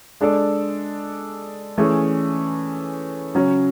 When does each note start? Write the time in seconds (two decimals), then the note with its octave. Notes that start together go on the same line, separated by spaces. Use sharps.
0.21 G#3 D4 A4 D5
1.78 E3 A3 C#4 G#4
3.35 C#3 F#3 C#4